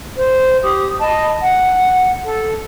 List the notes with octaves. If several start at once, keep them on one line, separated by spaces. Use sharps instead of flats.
C5
G4 D#6
D#5 A5 B5
F#5
A4